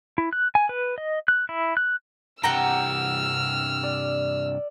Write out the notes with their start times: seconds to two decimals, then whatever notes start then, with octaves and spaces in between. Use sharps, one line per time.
0.18 E4
0.33 F#6
0.55 G#5
0.69 B4
0.98 D#5
1.28 F#6
1.49 E4
1.77 F#6
2.44 G2 C3 F#5 G5 A#5 E6 F6
3.83 D5